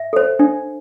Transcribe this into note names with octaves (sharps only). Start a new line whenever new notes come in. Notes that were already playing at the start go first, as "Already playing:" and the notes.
Already playing: E5
A4 C5
D4